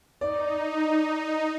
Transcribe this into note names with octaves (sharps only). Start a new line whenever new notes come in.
D#4 D5